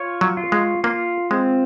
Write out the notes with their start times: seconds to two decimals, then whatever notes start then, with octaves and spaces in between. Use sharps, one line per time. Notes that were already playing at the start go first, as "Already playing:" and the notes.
Already playing: F4 C#5
0.21 F#3
0.37 F4
0.52 G#3
0.84 A#3 F4
1.31 G#3 C4